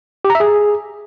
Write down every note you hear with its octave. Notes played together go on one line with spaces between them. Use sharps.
G4
A#5
E5
G#4